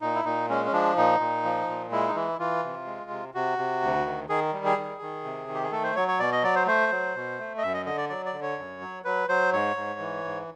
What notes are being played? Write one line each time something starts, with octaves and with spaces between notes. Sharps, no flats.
A#2 D#4
E4
A#2 D#4
G#3 C#4
C#4
F3 D4
A#2 D#4
A#2
F3
A#2
G#3 E4
D#4
E3 E4
E3 F4
C3
G#3
C3
C3 F#4
C3
D2
D#3
D#3 G#4
G3
G#4
D#3
D#3
C3
D#3
G4
G#4
A3 A4
C5
F#3 C#5
C#5
B2 D5
D#5
F#3 D5
C5
A3 C5
F#3
B2
A3
D#5
F#2 E5
D#5
D3 D#5
D5
F#3 D5
D5
D3
C#5
F#2
F#3
F#3 B4
F#3 C5
G#2 C#5
G#2
E3
G#2